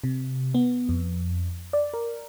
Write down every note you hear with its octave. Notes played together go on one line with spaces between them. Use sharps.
C3
B3
F2
D5
A#4